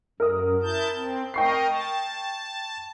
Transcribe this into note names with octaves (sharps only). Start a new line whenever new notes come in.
F#2 A#4 D#6
E4 A5 G6
C4
A#4 D#5 G5 C#6 C7
A5